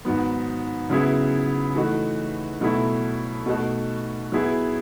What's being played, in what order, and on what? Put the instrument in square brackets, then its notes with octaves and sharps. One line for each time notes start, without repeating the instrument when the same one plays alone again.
[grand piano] G#2 D#3 F#3 B3
C#3 F#3 B3 E4 G#4
E3 A3 D#4 F#4
B2 F#3 A3 E4
B2 A3 D#4 F#4 A4
F#3 B3 E4 G#4